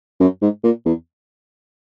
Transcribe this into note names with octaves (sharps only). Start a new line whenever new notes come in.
F#2
G#2
A#2
E2